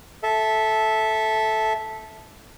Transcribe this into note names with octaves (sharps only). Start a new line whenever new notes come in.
A4 E5